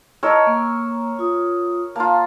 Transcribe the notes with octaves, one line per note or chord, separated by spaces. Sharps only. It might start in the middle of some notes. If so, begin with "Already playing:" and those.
E4 A#4 C#5 D#5 A5 E6
A#3
F4 D#6
A#3 F4 A5